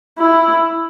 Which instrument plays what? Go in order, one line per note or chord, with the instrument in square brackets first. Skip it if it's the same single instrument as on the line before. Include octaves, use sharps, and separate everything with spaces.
[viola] E4